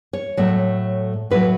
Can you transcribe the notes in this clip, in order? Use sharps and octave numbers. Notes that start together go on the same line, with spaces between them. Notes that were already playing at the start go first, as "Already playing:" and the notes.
C#5
A2 F#3 A3
A2 F#3 A3 B4